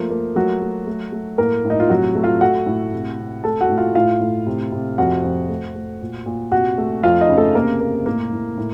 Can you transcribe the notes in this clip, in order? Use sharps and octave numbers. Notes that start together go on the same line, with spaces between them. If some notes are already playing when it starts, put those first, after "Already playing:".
Already playing: F3 A3 A#3
A#3
F#3 A3 F#4
A3
A3
A3
A2 A#3 A#4
A2
D#4
F4
C3 F#3 F#4
A3
F4 F5
A3 F#4 F#5
A2
C3
C3
A3 A4 A5
F#4 F#5
A2
F4 F5
A2 F4 F5
A2
C3
C3
F2 F#4 F#5
F2
A3
A3
A#2
A#2
C3 F#4 F#5
A3
F2 F4 F5
D#4 D#5
C#3
A3 A4
C3 A#3 A#4
A#3
A2 A#3 A#4
A2
A2